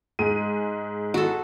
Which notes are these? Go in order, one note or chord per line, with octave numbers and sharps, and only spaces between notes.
G#2 G#3 D#7
F#4 A4